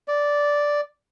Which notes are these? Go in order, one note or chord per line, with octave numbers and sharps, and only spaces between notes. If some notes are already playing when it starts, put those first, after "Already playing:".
D5